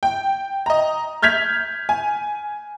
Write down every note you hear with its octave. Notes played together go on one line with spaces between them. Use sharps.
G5
D#5 A#5
F6 G6 G#6 B6 F7
G#5